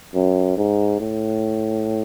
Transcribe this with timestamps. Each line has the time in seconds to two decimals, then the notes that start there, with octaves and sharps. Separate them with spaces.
0.15 F#2
0.57 G#2
1.00 A2